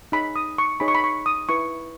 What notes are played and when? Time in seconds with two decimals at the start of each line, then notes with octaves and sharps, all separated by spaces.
0.12 D#4 G#4 C#5 B5
0.36 D#6
0.58 C#6
0.80 D#4 G#4 C#5 B5
0.88 C#6
0.95 B5
1.04 C#6
1.26 D#6
1.49 E4 B4 C#6